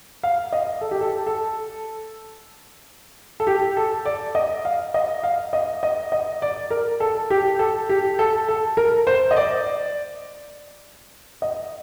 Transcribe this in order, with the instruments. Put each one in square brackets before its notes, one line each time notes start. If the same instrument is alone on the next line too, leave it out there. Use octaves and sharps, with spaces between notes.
[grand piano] F5
D#5
A4
G4
A4
A4
A4
G4
A4
D5
D#5
F5
D#5
F5
D#5
D#5
D#5
D5
A#4
A4
G4
A4
G4
A4
A4
A#4
C5
D#5
D5
D#5